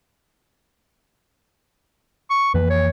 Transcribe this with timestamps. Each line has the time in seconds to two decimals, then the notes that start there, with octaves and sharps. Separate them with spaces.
2.30 C#6
2.54 F2 E3 A#3 B4
2.70 C#5